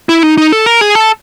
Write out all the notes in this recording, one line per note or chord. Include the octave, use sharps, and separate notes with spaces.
E4
D#4
D#4
A4
A#4
G#4
A4